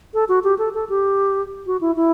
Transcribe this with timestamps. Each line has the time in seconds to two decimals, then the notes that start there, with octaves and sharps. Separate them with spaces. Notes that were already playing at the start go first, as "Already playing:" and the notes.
0.14 A4
0.29 F#4
0.44 G4
0.59 A4
0.74 A4
0.89 G4
1.67 F#4
1.81 E4
1.96 E4